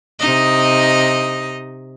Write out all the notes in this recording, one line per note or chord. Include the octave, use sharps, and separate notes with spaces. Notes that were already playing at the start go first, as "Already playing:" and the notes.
C3 D#4 D#5